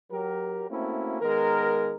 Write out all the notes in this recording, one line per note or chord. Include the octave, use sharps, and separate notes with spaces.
F#3 G4 A#4
A3 A#3 C4 C#4 E4 F#4
D#3 G#3 B3 A#4